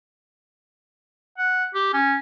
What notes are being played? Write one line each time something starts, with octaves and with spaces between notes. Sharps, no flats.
F#5
G4
C#4